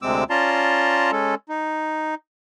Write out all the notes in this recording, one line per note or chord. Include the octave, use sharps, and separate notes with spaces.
D2 C3 G#3 C4 D6 E6
C#4 F4 D5 A5 A#5 C6
G#3 C#4 A4
D#4